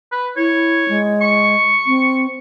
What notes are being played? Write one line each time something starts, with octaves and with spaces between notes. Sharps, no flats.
B4
E4 C#5
G#3
C#6
C4